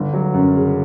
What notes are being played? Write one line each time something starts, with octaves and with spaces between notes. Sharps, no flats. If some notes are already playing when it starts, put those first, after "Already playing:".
Already playing: G1
F#3
F#2
C#3